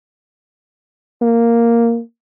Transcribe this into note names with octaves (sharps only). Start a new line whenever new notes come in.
A#3